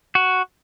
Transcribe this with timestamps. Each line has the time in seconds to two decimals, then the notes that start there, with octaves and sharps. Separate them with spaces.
0.15 F#4